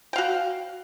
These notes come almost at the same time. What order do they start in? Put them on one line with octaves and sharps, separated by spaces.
G5 F5 F#4